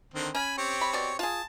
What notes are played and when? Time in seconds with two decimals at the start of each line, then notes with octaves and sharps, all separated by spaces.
0.14 D3 D#3 C4
0.35 C#4 G#5 B5
0.58 C4 G4 C#5
0.81 B5
0.93 B2 D5
1.19 F4 G#4 A5